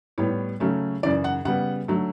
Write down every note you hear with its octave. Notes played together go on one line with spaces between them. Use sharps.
A2 G3 B3 C#5
C#3 F#3 A3 C#4
F#2 C#3 E3 D5
F#5
C#3 G3 B3 F#5
D3 F#3 A3